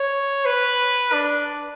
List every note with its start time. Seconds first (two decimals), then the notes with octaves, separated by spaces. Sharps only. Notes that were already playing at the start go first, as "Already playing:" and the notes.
Already playing: C#5
0.45 B4
1.13 D4